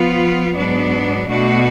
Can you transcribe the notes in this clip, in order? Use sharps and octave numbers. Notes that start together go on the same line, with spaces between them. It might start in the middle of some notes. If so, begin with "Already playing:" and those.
Already playing: F3 B3 F4
G#2 F#3 B3 D4
B2 A3 D4 F#4